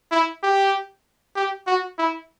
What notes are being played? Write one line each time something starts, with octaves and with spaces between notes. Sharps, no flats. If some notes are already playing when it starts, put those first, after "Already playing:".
E4
G4
G4
F#4
E4